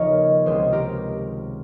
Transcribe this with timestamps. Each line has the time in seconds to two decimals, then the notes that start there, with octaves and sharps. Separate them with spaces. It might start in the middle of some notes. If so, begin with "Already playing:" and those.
Already playing: D#2 C#3 F3 A#4 C#5 D#5
0.45 C#2 C3 D#3 G#4 C5
0.72 G4 A#4